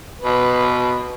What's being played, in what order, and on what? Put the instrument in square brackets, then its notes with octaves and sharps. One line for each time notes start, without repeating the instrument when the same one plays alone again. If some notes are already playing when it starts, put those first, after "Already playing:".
[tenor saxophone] B2 [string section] B4